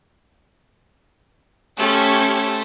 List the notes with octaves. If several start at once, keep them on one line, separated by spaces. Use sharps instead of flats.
A3 C#4 G4 C5